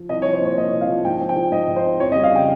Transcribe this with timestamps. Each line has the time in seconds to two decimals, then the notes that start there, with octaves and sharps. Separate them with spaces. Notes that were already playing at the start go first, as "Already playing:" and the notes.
Already playing: F3
0.09 C2 D#5
0.22 C#5
0.26 F3
0.33 C5
0.41 A#2 C#5
0.57 A#3 D#5
0.72 C2
0.81 F5
0.89 F3
1.05 G#2 G5
1.21 C4
1.29 G5
1.36 F3
1.52 G#2 D#5
1.67 G#2
1.76 C5
1.84 C4
1.99 F2 C#5
2.12 D#5
2.15 G3
2.23 F5
2.32 C#3 G5